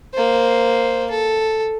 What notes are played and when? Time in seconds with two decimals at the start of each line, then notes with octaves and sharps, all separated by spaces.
0.14 A#3 C5
1.10 A4